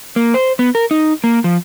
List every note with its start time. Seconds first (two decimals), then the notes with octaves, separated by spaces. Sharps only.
0.16 A#3
0.34 C5
0.59 B3
0.75 A#4
0.91 D#4
1.24 A#3
1.44 F3